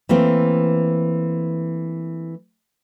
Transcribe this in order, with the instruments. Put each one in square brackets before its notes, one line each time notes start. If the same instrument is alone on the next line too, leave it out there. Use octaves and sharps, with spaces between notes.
[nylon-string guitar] E3 A3 A#3 C4